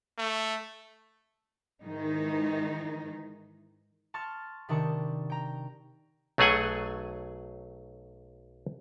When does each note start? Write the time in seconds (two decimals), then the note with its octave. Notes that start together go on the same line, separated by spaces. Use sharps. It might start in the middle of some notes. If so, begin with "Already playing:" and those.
0.18 A3
1.82 G#2 D#3 E3 D#4
4.14 A5 C6 C#6 F6 A6
4.69 C3 D#3 D4 G5 A5 C#6
5.30 G5 A#5
6.38 B1 F#3 A3 G#4 F#5 G#5